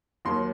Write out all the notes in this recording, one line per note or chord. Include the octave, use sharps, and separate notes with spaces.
D#2 D#3 F#3 C6